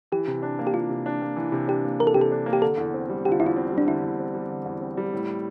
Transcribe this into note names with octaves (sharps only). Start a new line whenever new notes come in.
E3 G4
C3
D4
A#3
G4
E3 F4
C3
D4
A#3
E3
C3
D4 G4
A#3
E3 A#4
A4
C3 G4
A4
D4
A#3
G4
D3 A4
E2
C4
G3
D3 G4
F4
E2 E4
F4
C4
G3
D4
D3 E4
E2
C4
G3
D3
E2
C4
G3
A2